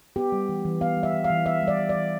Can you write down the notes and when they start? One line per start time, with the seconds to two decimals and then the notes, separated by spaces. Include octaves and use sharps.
0.16 B3 G4
0.32 G3
0.49 E3
0.65 E3
0.81 B3 F5
0.97 G3
1.03 E5
1.13 E3
1.24 F5
1.30 E3
1.46 B3 E5
1.62 G3
1.68 D5
1.79 E3
1.89 D5
1.95 E3